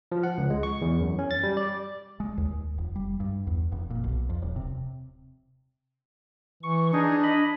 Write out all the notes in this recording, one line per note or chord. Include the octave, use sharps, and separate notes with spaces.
F3
F#5
C#2
G#3
C#6
E2
F#2
C#4
A6
G3
D5
G#3
D#2
F1
G3
G2
E2
F1
A#2
B1
F2
D#1
C3
E3 C#6
D4 D#4 G#4
D#5 B5